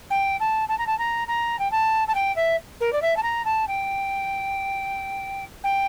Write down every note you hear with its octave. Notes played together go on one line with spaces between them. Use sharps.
G5
A5
A5
A#5
A5
A#5
A#5
G5
A5
A5
G5
E5
A#4
D5
E5
A5
A#5
A5
G5
G5